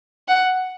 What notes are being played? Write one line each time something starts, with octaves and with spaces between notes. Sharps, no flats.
F#5